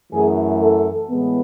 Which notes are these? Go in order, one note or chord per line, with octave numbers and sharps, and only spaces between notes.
F#2 E3 A3 G#4
A4
A2 E3 G#3 B3